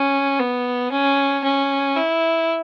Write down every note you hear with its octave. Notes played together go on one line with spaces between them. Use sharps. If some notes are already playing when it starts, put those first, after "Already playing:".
Already playing: C#4
B3
C#4
C#4
E4